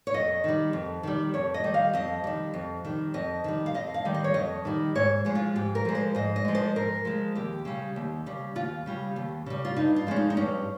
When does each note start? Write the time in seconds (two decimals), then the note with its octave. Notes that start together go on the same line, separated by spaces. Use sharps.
0.07 C#5
0.14 F2 D#5
0.44 D#3 G3
0.73 F2
1.03 D#3 G3
1.34 F2 C#5
1.54 D#5
1.64 D#3 G3
1.74 F5
1.93 F2 D#5
2.24 D#3 G3
2.54 F2
2.85 D#3 G3
3.14 F2 D#5
3.44 D#3 G3
3.66 F5
3.74 F2 D#5
3.94 F5
4.05 D#3 G3
4.14 D#5
4.24 C#5
4.34 F2 D#5
4.65 D#3 G3
4.95 G#2 C#5
5.25 F3 G#3
5.35 F4
5.56 G#2 G4
5.75 A#4
5.85 F3 G#3
5.95 C5
6.15 G#2 D#5
6.36 D#5
6.45 F3 G#3
6.55 C5
6.76 G#2 A#4
7.05 F3 G#3
7.35 D#2 G4
7.65 C#3 G3
7.96 D#2
8.26 C#3 G3
8.55 D#2 F4
8.86 C#3 G3
9.16 D#2
9.46 C#3 G3
9.65 F4
9.76 G2 D#4
9.96 F4
10.07 F3 G#3 C#4
10.16 D#4
10.30 D#4
10.37 G2 C#4